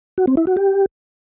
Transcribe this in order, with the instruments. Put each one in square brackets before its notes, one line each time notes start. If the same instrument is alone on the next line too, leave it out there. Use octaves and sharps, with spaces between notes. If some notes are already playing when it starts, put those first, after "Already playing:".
[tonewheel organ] F#4
C4
E4
F#4
G4